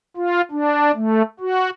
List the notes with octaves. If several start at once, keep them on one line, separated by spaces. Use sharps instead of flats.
F4
D4
A3
F#4